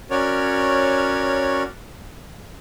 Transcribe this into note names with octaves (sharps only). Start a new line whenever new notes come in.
C#4 F#4 A#4 C#5 D5 F6